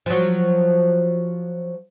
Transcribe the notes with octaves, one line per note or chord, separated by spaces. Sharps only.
F3 F#3